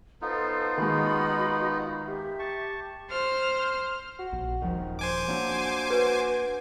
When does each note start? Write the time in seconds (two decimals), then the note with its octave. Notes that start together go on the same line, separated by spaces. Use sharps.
0.22 B3 D#4 F4 A4 C5
0.78 D#3 G#3 F#4 D#5 B5
2.05 G4 E5
2.39 A5 C#6
3.10 C5 F6
4.19 F#4
4.32 A#1
4.62 D#1 D#3 F3
4.99 C5 G#5 D6
5.28 F#3 A#3 C#4 D4
5.90 F#4 B4